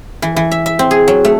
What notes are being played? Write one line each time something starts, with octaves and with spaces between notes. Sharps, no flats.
E3
E3
E5
E5
C4
G#4
F#3
A3